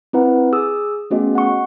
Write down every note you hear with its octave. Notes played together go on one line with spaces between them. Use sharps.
C4 E4 B4 F#5
G#4 D#6 E6
A3 B3 C#4 F#4 G#4 D#5
F#5 C#6